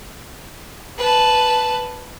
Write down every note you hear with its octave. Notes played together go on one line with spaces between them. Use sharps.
B4 A5